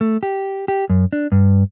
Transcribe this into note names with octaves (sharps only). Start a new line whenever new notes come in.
A3
G4
G4
F#2
D4
G2